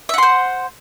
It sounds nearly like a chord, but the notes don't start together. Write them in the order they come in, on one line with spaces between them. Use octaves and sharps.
E5 F#5 C6 C5